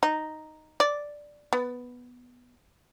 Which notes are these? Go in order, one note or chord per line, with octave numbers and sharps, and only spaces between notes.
D#4
D5
B3